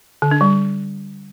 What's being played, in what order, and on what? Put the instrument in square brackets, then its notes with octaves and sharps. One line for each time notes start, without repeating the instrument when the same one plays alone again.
[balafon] D3
D4
G3